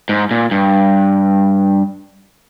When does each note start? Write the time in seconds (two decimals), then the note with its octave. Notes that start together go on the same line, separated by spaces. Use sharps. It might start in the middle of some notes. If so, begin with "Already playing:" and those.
0.09 G#2
0.31 A#2
0.51 G2